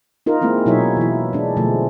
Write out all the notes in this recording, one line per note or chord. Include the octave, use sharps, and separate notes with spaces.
D#4 F4 A#4
G#3 A#3 C4 E4
B2 F#3 D#4 E4 C#5 E5
E3 E4
G#3 D4
B2 D3 F3 G#3 A3